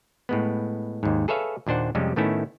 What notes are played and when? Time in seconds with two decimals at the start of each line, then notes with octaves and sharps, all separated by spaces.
0.29 A2 G#3 B3
1.03 D#2 G#2
1.28 G#4 A4 B4 C#5 E5 F5
1.67 D#2 A#2 D4 C5 F#5
1.95 F2 C3 G3 G#3 C#4
2.16 A2 D#3 A3 B3 C#4 E4